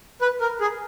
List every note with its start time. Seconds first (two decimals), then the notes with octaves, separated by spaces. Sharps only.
0.21 B4
0.41 A#4
0.61 G#4